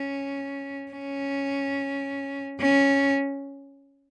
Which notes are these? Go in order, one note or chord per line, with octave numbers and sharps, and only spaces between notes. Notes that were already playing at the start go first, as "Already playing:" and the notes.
Already playing: C#4
C#4
C#4